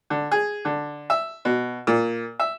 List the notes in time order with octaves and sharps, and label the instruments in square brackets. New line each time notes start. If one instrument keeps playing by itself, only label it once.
[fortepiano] D3
G#4
D3
E5
B2
A#2
E5